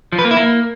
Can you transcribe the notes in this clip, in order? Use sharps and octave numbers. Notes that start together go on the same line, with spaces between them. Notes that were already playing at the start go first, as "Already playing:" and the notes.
F3
B4
A#3
E4
A#3